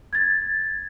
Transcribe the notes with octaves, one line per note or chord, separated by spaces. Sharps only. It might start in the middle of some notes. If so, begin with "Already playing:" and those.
G#6 A6